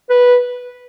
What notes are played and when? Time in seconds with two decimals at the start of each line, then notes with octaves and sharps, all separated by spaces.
0.10 B4